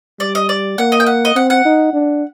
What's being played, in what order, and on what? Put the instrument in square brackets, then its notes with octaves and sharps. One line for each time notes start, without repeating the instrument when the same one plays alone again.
[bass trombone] G3 [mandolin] D5
[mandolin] D#5
D5
[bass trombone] A#3 [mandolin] F#5
[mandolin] D#5
G5
F#5
D#5
[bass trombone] C4 [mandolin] F#5
[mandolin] F#5
[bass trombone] D#4
D4